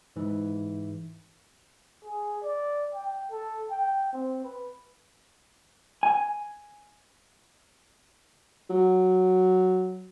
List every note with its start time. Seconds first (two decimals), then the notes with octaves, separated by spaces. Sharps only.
0.16 G#2 E3
2.04 G#4
2.43 D5
2.94 G5
3.31 A4
3.71 G5
4.13 C4
4.44 B4
6.03 G#5
8.70 F#3